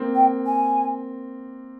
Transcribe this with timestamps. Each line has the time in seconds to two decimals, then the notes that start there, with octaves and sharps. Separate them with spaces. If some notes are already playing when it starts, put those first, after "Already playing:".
Already playing: A#3 C4
0.15 G5
0.46 G#5